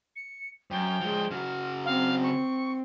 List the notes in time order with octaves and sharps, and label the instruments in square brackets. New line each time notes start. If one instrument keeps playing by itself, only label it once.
[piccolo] C#7
[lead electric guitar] F#2 [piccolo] G5
[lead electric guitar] F3 G#3
[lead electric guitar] C#3 F#4 [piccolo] F6
[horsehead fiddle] C4 [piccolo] F5
[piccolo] C#6